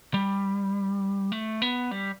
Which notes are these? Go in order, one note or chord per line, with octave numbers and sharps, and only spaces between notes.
G3
A3
B3
G3